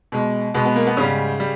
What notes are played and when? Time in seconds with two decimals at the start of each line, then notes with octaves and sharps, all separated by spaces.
0.12 B2 G#3
0.54 B2 G#3 B3
0.65 B3
0.76 A#3
0.87 B3
0.97 G#2 C#3 G3 C#4
1.40 G3